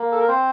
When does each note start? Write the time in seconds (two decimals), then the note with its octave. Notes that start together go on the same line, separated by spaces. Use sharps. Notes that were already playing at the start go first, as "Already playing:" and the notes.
Already playing: A#3
0.12 A4
0.19 A#4
0.28 C4 C5